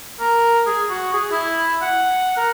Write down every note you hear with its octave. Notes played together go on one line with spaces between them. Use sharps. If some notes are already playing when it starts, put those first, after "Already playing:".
A#4
G#4
F#4
G#4
E4
F#5
A#4